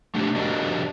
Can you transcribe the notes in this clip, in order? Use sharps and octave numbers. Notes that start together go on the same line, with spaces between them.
A3 D4 G4
D4 F#4 G4 A#4 D5 D#5